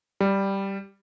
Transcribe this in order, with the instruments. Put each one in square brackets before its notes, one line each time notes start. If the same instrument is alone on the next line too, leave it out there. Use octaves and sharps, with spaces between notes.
[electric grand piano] G3